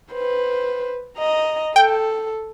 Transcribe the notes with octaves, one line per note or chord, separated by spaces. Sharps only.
B4 C5
D#5 A#5
A4 G5